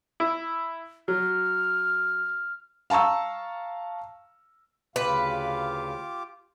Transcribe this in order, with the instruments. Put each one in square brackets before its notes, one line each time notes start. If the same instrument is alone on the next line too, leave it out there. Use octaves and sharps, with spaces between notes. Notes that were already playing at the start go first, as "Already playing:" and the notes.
[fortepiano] E4
[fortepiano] F#3 [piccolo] F6
[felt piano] F5 A5 A#5 C#6 E6
[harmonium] D2 C#3 F5 [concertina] F4 G4 D6 [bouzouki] B4